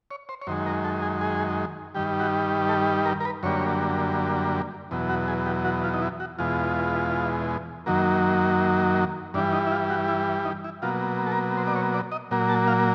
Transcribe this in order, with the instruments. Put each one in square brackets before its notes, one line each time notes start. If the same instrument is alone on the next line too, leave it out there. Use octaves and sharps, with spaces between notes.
[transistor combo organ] C#5
C5
C#5
F#2 D#3 G#3 C5
A#4
A4
G#4
G#4
G2 D#3 G3 G4
F#4
A4
A#4
A#4
B4
F#2 D3 G3 A#3 C#5
E2 B2 F#3
F#4
G#4
G4
F#4
F4
D#4
E4
F#4
E2 B2 G#3 F4
F#2 D#3 F#3 A#3
G2 E3 G3 D4
D#4
E4
F4
F#4
E4
D#4
E4
B2 F#3 A#3 F4
A4
A#4
C5
D5
C#5
D5
D#5
A#2 F#3 A#3
A5
F5